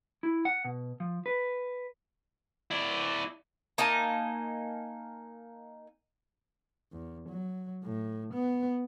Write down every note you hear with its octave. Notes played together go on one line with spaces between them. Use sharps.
E4
F#5
B2
F3
B4
E4 D5
A#3 D#4 G#5 A5
E2
F#3
A2
B3